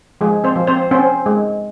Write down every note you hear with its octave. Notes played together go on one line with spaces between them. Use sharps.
F3 G#3 G#4
C4 C5
F3
C4 C5
C4 C#4 C5
G#3